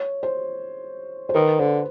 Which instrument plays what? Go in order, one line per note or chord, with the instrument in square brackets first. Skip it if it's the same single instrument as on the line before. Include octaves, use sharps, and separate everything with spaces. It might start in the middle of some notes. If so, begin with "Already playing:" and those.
Already playing: [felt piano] C#5
C5
C5
[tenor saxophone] D#3 [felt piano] B4
[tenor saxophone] D3 [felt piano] C5